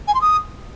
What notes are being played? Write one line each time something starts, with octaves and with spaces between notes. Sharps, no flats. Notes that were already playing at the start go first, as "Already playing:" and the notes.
G#5
C6
D#6